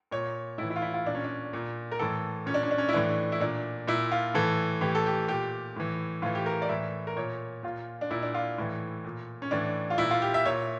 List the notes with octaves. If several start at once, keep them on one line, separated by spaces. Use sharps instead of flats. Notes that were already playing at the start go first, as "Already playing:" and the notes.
A#2 C#5
A2 E3 E4
E4
F4
E4
F4
A#2 D4
C#4
D4
A#2
A#4
A2 E3 A4
A#2 C#4
D4
C#4
D4
C#4
E4
A2 E3 D4
E4
A#2 D4
A#2 E4
F4
A2 E3 A4
A2 E3 G4
A4
G4
A#2 G4
A2 E3
A2 E3 F4
G4
A#4
D5
A2 E3 E5
A#4
A#2 C#5
A#2 F4
D4
A#2 E4
D4
F4
A2 E3
A#2
C#4
A2 E3 D4
F4
A#2 E4
F4
G4
E5
A#2 C#5